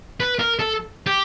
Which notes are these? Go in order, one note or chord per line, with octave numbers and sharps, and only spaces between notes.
B4
A#4
A4
G4